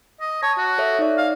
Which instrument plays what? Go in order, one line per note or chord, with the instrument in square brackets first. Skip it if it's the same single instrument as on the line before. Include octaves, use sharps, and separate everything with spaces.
[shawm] D#5
[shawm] C#5 [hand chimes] A5
[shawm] F#4
[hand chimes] A4 C#5 E5
D#4 D5
[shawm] F5